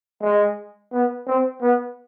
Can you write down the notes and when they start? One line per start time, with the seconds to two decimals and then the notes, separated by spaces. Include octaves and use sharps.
0.21 G#3
0.92 B3
1.27 C4
1.61 B3